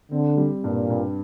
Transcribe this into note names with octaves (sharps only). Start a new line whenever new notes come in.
D3 C4
G3
G2 A#2
G2